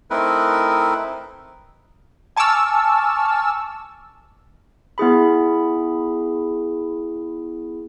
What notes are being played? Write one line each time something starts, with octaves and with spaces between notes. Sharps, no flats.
A3 C4 D#4 E4 A#4 B4
G#5 A5 C#6 D6 E6 F6
B3 E4 G#4 B5